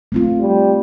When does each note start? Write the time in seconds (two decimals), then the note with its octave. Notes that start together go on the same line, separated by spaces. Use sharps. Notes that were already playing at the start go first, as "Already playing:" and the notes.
0.12 A3 C4 F4
0.41 G3